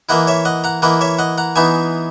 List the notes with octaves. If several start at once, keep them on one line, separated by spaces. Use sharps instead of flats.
E3 A#3 E4 D#5 F#5
C#5 E5
D#5 F#5
F#5 A#5
E3 A#3 E4 D#5 F#5
C#5 E5
D#5 F#5
F#5 A#5
E3 B3 D#4 E5 G#5